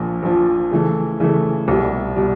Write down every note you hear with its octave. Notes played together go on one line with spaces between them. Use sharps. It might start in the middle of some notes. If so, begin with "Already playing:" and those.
Already playing: A#1 A#2 F3
A#1 A#2 F3
C#3 E3 A3
C#3 E3 A3
C2 B2 G3
B2 G3